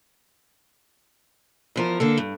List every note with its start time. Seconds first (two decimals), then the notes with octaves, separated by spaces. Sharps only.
1.76 E2 F3 A#4
2.00 D3 A#3 A4
2.17 G2